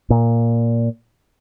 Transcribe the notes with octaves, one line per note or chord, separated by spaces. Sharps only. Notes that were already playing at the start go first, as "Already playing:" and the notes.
A#2